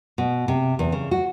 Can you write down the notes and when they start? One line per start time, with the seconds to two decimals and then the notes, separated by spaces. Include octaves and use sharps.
0.18 B2
0.48 C3
0.79 E2
0.92 C#3
1.11 F#4